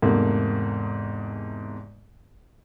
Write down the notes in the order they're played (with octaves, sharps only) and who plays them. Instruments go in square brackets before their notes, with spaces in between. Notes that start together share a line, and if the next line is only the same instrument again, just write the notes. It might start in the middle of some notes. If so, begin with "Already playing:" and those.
[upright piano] E2 G#2 C3 A3 A#3